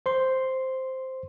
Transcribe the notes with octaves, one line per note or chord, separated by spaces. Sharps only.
C5 C6